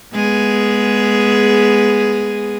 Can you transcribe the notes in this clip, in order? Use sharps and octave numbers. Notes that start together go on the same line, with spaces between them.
G#3 B3 G#4